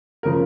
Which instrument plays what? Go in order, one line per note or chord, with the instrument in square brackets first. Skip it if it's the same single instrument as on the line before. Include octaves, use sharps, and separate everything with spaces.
[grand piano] C#3 F3 A#4